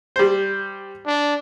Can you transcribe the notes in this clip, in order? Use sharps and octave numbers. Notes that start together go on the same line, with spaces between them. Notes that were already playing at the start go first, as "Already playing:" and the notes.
G3 C5
D4